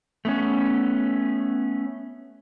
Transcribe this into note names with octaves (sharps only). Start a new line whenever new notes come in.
A3 B3 C#4